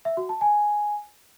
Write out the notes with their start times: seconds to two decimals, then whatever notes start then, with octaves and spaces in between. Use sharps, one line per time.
0.05 E5
0.17 F#4
0.29 A5
0.41 G#5